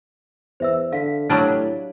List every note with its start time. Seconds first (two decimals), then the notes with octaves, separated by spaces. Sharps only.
0.60 E2 C5 E5 E6
0.93 D3 F5 B6
1.30 A2 F#3 G3 D4